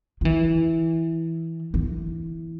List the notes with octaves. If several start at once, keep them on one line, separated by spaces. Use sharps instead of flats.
F3
E3
E3